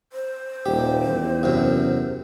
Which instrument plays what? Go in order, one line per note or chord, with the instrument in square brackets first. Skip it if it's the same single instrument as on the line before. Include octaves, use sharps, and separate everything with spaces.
[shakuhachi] C5
[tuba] D#1 [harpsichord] G4
[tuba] E2
[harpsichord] F#2 C3